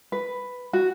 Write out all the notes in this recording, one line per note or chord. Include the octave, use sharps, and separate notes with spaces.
B4
F#4